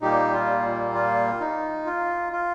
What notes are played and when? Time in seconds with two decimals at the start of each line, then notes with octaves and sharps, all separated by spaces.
0.02 A#2 G3 A#3 D#4 G4
0.33 F4
0.94 F4
1.40 D#4
1.86 F4
2.32 F4